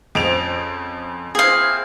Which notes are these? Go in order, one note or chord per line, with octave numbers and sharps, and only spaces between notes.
F2 C#3 F3 D7 F7
A#3 C4 E4 G#4 F5